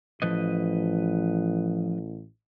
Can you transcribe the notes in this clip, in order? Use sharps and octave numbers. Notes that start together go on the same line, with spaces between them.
A1 F3 B4 D#5